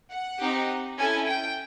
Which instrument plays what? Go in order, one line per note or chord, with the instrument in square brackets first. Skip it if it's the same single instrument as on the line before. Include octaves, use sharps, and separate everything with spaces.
[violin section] F#5
C4 D#4 G4
C#4 E4 A4 G#5
G5